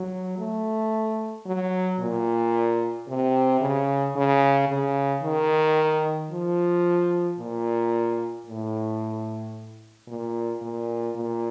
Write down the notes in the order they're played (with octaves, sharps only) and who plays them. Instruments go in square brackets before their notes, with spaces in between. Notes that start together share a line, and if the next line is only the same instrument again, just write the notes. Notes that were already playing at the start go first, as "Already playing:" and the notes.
Already playing: [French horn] F#3
A3
F#3
A#2
C3
C#3
C#3
C#3
D#3
F3
A#2
A2
A#2
A#2
A#2